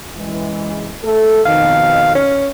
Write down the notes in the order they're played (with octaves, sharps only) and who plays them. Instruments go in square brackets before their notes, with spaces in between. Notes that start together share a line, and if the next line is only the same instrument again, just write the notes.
[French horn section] F#2 E3 G#3
A3 A4
[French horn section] F2 B2 D#3 [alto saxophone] F5
[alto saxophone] C#4